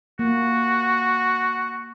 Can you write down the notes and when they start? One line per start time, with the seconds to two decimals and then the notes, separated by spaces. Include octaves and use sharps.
0.19 A#3 F#4